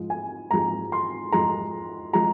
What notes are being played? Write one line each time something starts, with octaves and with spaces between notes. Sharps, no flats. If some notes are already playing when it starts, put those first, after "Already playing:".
Already playing: G#2 F3 G#3
G#5
G#2 F3 G#3 A#5
C6
G#2 F3 G#3 A#5
F3 G#3 A#5